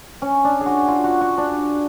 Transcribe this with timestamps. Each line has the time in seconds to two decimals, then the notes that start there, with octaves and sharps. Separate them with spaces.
0.22 C#4
0.44 D4
0.61 G#4
0.66 F#4
0.88 F4
1.04 F#4
1.21 F#4
1.38 D4